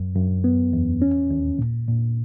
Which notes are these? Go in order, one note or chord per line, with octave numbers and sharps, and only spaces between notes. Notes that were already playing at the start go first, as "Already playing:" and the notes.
Already playing: F#2
F#2
B3
E2
C#4
D#2
A#2
A#2